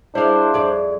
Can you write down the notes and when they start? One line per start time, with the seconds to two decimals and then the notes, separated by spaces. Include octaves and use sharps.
0.15 D4 E4 G#4 C5 F5
0.54 F2 D5